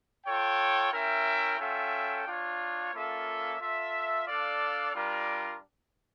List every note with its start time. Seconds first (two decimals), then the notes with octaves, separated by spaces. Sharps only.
0.25 F4 A4 C#5 G5
0.91 C#4 E4 A#4 E5 G5
1.59 C#4 F4 A4 E5 G5
2.26 D4 F4 C#5
2.93 A#3 C#4 F4 A4 E5
3.59 F4 A4 E5
4.27 D4 A4 D5 F5
4.94 G3 D4 F4 A#4